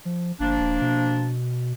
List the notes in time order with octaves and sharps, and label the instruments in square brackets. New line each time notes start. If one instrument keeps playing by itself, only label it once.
[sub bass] F3
[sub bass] G1 [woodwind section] F3 A#3 D4
[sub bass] D#1
B2